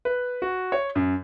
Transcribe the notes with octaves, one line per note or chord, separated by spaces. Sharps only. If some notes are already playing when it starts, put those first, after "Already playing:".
B4
F#4
C#5
F#2